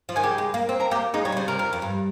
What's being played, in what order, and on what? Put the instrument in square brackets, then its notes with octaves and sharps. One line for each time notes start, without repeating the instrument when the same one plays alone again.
[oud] F3
[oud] D#3 [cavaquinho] G#5
[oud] C#3 [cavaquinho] G4 G5
[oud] G#3
A#3
C4
[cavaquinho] A#4 A#5
[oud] A#3 [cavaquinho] G4 G5
[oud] G#3 [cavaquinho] D#4 D#5
[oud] G3 [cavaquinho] C#5
[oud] C3
[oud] C#3 [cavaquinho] C5
[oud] C3 [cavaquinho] A#4
[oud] F2 [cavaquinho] A#4
[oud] F2
G2